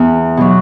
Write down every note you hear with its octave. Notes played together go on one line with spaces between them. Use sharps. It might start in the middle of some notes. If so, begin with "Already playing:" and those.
Already playing: E2
B2 F#3